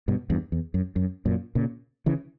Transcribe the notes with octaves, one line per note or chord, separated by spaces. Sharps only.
G2 B2
E2 G2
E2
F#2
F#2
F#2 A#2
A#2 C#3
C#3 E3